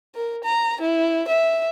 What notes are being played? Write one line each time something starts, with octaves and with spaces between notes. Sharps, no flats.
A#4
A#5
E4
E5